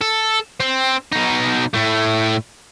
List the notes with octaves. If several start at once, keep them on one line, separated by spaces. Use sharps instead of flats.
A4
C4
B2 D#4
A2 A3